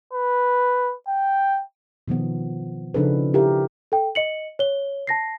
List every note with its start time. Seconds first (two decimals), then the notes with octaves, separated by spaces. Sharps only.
0.13 B4
1.08 G5
2.08 B2 D#3 F3 B3
2.94 C#3 F3 D4 D#4 A4 B4
3.34 E4 G4 A#4 E5
3.92 A4 G5
4.15 D#5 C#7 F#7
4.59 C#5 G7
5.07 A5 A#6 C7